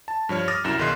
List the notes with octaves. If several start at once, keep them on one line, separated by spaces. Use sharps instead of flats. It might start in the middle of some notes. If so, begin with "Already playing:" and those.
A5
G2 F3 C#5 F6
D6 D#6 F6 A6 A#6
C2 F#2 E4 E7
B1 D#3 D#4 G#4 C6 F#6